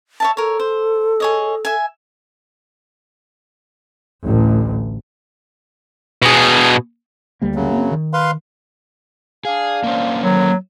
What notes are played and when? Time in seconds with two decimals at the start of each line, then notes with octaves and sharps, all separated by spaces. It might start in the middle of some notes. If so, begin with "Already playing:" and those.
0.20 C#5 E5 A5
0.37 A4 A#4 C#5
0.60 C5
1.20 G#4 C#5 D#5
1.65 E5 G#5
4.24 A1 D2
6.22 B2 G#4
7.42 D2 G3 A#3
7.55 F#2 C#3 F#3
7.72 A#3 C4
7.92 D#3
8.13 B4 F5 C6
9.45 D4 G#4 D5 F5
9.84 A#3 C#4 C5
10.22 A2 D3 D#3 F#3